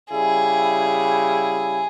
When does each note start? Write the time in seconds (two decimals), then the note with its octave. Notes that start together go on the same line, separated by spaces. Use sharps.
0.12 C#3 G3 E4 G#4